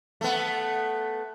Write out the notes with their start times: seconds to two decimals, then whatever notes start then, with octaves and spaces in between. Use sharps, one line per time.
0.21 A3 B3